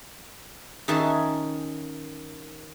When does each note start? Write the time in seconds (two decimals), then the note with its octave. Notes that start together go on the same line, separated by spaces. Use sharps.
0.88 D#3 C#4 G#4 E5 F#5 A5